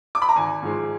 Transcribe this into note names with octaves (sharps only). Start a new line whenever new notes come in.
D6
B5
A#5
G#1 G#5
G#2 F3 G#3